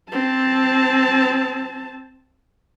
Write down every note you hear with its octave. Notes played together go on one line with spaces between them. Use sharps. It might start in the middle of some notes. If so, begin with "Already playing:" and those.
C4 A5